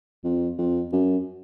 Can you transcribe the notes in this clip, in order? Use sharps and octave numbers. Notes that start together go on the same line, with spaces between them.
F2
F2
F#2